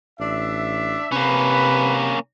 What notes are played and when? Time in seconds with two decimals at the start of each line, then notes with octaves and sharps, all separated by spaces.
0.20 A1 D4 E5
1.12 C3 A#3 C#4 B4